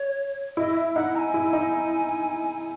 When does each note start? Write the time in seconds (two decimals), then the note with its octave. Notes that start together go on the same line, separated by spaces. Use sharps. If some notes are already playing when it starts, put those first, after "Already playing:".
Already playing: C#5
0.57 E4 D#5
0.76 E5
0.95 D#4 F#5
1.15 A#5
1.18 G#5
1.34 E4
1.53 D#4